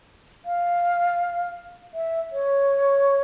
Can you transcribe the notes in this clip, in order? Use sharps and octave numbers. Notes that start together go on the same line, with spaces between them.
F5
E5
C#5